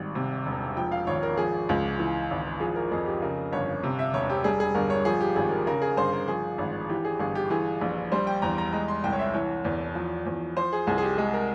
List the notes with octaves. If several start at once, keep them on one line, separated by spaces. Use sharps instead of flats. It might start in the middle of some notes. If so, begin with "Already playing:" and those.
Already playing: G#1 G3
C3
E1
F3 G5
F5
G#1 C#5
A#4
F3 G#4
C#2
E3
G#1
F3 G#4
A#4
F2 G#4
G4
C#3 A#4
G1 C#5
C3
E5
E1 C#5
G4
G3 G#4
G#4
G1 A#4
C#5
F3 G#4
G4
G#1 G#4
A#4
C#3 A#4
G#4
G1 C5
A#4
F3 G#4
G#1
E3 G4
G#4
G1 G#4
G4
E3 G#4
A#1
G3 C5
G5
E2 A#5
A#5
G#3 A#5
C6
C2 G5
C#5
E5
E3 C#5
E2
F3
E2
F3 C5
G#4
C2 G#4
G#4
G4
G#3 G#4
A#4